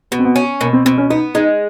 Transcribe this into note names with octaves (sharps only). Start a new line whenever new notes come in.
B2 B3
C4
B3
C#4
B2 A#3
C4
B2 C4
C#4
B3 D#4
G#3 D#4